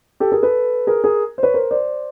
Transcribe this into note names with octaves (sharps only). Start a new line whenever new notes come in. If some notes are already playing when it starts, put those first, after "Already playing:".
G4 A4
G#4 A#4
A4 B4
G#4 A#4
G#4 A#4
C5
B4 C#5
A#4 C5
C5 D5